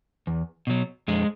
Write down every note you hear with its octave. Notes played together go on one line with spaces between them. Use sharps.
E2
B2 F#3
F2 G#3